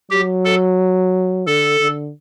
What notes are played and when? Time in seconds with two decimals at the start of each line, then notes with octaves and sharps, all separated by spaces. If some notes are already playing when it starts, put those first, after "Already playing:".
0.11 F#3 G4
0.45 A4
1.47 D3 A4
1.80 D3